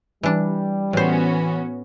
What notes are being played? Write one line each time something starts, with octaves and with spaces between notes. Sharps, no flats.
E3 G3 D4
A2 E3 B3 C#4 F#4 C5